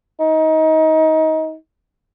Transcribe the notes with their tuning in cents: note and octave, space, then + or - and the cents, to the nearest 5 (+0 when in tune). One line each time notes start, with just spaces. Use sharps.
D#4 +25